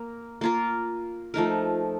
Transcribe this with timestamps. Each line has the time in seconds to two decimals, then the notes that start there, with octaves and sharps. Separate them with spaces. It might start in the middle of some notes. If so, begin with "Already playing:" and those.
Already playing: A#3 A#4
0.41 A#3 F4 A#4
1.34 F3 A3 D#4 A#4